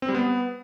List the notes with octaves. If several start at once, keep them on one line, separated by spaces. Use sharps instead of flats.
C4
G3
B3